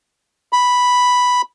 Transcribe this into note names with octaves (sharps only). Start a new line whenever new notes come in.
B5